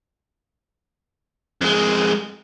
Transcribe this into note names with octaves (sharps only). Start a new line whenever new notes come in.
F2 G#3